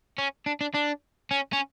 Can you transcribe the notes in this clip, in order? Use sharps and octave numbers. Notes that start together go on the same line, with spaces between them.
C#4
D4
D4
D4
C#4
C#4